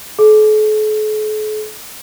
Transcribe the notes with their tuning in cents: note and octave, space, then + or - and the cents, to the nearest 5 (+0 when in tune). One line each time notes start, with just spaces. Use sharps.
A4 -45